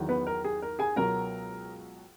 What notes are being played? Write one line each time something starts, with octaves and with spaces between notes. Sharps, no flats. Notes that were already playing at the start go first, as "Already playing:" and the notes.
Already playing: E2 D#3 F#3
B3 B4
A#4
G#4
A#4
G#4 G#5
C#2 B2 F#3 A#4 A#5